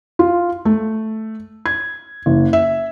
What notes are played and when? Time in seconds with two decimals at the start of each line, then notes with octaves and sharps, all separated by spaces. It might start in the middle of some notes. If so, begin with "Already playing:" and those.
0.19 F4
0.65 A3
1.66 G#6
2.26 F#1
2.53 E5